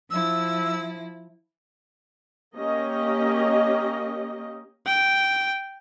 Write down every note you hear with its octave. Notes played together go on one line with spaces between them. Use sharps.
F3 E4 E6
A#3 C#4 G4 D#5
G5